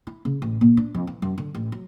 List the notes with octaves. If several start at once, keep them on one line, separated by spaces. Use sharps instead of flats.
E4
C#3
A1
A#2
D4
F2
E3
F#2
D3
A1
F#3